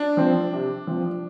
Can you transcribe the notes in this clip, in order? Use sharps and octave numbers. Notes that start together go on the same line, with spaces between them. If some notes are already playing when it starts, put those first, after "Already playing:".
Already playing: D4
F3 C4
C3
F3 C4